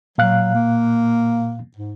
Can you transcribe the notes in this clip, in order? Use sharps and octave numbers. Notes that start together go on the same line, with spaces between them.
A#2 F#3 F5 F#6
A#3
G#2